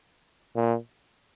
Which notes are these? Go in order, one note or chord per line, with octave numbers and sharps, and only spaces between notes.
A#2